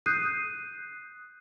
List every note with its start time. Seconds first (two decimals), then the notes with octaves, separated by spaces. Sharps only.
0.06 D#6 F#6 G6 C7 D#7